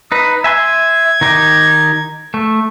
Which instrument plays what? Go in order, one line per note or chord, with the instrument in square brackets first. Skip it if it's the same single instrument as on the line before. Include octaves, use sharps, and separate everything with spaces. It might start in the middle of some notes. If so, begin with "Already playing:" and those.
[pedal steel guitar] D#4 B4 [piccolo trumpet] D#6
[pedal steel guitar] E5 G#5 C6 [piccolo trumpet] G#6
[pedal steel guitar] D#3 D#4 G4
A3